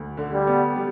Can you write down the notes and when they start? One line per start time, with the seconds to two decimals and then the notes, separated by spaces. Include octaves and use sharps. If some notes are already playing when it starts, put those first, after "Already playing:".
Already playing: D2
0.17 D3
0.32 G3
0.47 B3
0.76 G3